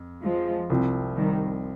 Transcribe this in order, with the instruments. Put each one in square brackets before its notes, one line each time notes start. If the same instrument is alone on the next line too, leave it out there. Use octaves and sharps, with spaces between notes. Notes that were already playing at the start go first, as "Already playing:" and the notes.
Already playing: [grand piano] F2
[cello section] F3 G#3
[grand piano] C2 C3 F3 C4
[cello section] D#3 G3